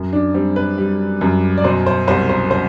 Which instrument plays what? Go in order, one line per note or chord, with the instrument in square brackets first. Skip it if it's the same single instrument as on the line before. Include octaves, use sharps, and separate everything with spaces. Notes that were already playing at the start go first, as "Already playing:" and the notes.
Already playing: [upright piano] F#2
D4
G3 C4
B4
G3
F#2
D5
B2 C5
C5
C2 C5
C5
C5